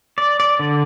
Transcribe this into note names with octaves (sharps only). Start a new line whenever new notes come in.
D5
D5
D3